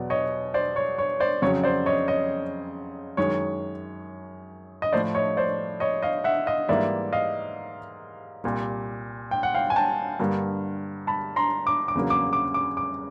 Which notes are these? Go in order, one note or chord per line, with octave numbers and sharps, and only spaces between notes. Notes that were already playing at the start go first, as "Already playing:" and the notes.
Already playing: E2 B2 F#3 D5
C#5 D#5
C5 D5
C#5
C#5
C5 D5
F2 C#3 F#3 C#5
C5 D5
C#5 D#5
C#5 D#5
F#2 D#3 G#3 C#5
D#5
A2 F3 A3 C5 D5
C#5 D#5
C5 D5
C#5 D#5
D#5 F5
E5 F#5
D#5 F5
G#2 E3 G3 A#3 D5 E5
D#5 F5
C2 A#2 G3
G5
F#5
F5 G5
G#5
G5 A5
G2 D3 G3 A#3
A5 B5
A#5 C6
D6
D6
E2 C#3 F#3 A#3
D6
D6
D6
D6